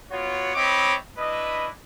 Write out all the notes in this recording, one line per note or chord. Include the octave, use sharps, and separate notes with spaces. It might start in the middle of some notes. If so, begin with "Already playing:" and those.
B3 F4 F#4 C#5
C4 E4 C#5 D#5 B5 D6
D4 E4 B4 D#5